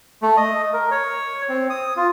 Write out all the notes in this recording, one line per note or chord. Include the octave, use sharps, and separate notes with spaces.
A3
D#5
A#4
C#5
C4
D#6
F4